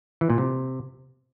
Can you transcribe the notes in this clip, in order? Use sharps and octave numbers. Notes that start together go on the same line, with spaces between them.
E3
A#2
C3